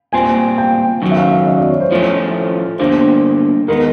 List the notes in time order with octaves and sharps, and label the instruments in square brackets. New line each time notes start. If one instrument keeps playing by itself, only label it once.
[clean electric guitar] A#2 G3 C4 [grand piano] G#5
[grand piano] G5
[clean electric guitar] F#2 D#3 F#3
[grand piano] E5
F5
E5
D#5
D5
C#5
C5
[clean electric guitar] A2 F3 A3 C#4
[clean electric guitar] G2 D3 G3 A#3 [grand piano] C5
[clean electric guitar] D#3 G#3 B3 [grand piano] A#4